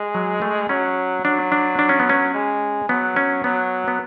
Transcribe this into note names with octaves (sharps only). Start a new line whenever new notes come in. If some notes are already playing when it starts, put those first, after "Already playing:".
Already playing: G#3
F#3
A3
F#3 C#4
F#3 D4
D4
D4
C#4
B3
C#4
G#3
F#3 B3
C#4
F#3 B3
B3